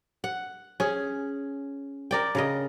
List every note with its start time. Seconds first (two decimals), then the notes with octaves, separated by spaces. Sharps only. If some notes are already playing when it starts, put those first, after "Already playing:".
0.24 F#5
0.80 C#4 G#4
2.11 A#4 D5 G5
2.35 C#3 A#4 D#5